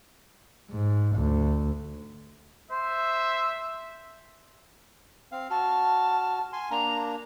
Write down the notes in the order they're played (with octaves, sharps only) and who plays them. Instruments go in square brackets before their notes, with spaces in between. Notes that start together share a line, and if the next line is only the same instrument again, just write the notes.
[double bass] G#2
D2
[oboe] C5 [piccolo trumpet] E5
[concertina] C4 F5
[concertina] F#4 F6 [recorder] A5
[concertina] G#5 C6
[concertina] A#3 D4 [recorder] A#5